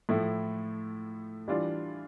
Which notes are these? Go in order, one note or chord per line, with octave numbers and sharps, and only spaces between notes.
A2 F3 A3 E4
E3 G3 D4 F4